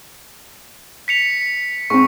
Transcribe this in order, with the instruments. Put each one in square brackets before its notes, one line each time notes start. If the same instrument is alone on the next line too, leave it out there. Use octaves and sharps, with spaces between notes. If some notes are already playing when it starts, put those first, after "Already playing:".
[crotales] B6 C#7 F7
[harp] G#2 C4 [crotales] C#6